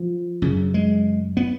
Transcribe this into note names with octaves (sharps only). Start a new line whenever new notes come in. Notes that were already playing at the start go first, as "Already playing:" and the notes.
Already playing: F3
F#2 C#3
G#3
B3